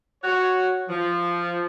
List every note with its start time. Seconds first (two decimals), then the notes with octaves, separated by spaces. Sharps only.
0.23 F#4 C#5
0.89 F3